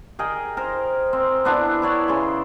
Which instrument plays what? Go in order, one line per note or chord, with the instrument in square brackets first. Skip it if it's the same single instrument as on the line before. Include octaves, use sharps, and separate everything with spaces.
[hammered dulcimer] G#4 A#4 D#5 G5
A#4 C5
C4
B3 D4 E4 A4
E4 C#5 D5
C#3 C6